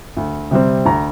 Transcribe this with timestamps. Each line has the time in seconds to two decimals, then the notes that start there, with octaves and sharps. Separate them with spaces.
0.17 D2
0.51 C3 G3 C4
0.85 D2 A#5